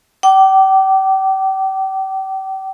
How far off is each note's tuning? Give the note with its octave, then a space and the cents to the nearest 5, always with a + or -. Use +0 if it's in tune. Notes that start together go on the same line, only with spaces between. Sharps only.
G5 -40 D6 +0